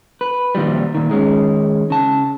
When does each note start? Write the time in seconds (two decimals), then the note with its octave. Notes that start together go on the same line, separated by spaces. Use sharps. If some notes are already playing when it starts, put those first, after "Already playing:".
0.21 B4
0.55 A#2 D#3 F3 G3
0.95 A#2 D#3
1.10 D#3 G#3 C#4
1.90 C#3 A5